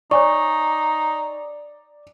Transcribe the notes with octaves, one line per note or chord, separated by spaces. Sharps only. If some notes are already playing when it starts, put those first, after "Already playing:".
D#4 C#5 D5 G#5 C#6